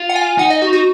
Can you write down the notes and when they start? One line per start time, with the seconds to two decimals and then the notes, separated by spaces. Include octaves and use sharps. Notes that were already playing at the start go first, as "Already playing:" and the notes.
Already playing: F4
0.09 F#5
0.16 G#5
0.38 D#4 F#5
0.50 D#5
0.62 F#4
0.73 F#4